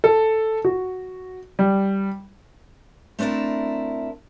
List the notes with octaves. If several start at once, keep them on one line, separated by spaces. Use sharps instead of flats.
A4
F#4
G3
A3 C4 D4 E4 A#4